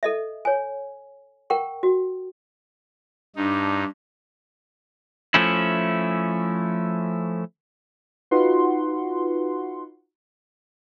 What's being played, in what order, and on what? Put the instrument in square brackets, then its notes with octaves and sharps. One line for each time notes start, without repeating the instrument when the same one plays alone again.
[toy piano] A4 D#5 E5
C#5 G#5
A#4 F#5 G5 C#6
F#4
[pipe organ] G2 D#4 [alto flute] D4
[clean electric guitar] F3 A3 C#4 E4
[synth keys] D#4 F4 F#4 B4 F#5 C6